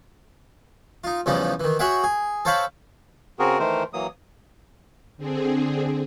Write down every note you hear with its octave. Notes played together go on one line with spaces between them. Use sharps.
D#4 F4
E2 C#3 E3 F3 G3 D#4
D#3 E3
F#4 G#4 C#5 E5 F#5 G5
G#4
A4 C5 C#5 F5 G5 B5
C#3 C4 F#4 G#4 A#4
D#3 E3 A3 A#4 C5
E3 F#3 A#3 D#6
D3 C4 G#4